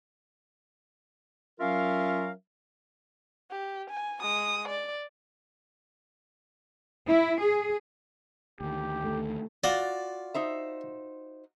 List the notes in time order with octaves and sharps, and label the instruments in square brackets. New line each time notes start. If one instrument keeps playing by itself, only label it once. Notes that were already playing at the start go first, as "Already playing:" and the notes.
[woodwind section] F#3 C#4 F4 A#4 E5 F5
[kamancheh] G4
G#5
G#3 D#6
D5
[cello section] E4
G#4
[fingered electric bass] D2 D#3 [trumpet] G4
[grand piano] A3
[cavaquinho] F4 F#4 [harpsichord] D5
[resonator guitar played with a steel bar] D#4 C5 E5